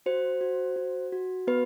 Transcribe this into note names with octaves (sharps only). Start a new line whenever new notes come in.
F#4 C5
F#4
F#4
F#4
B3 B4